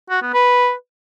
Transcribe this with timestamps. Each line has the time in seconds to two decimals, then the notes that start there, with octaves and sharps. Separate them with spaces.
0.10 F#4
0.22 B3
0.34 B4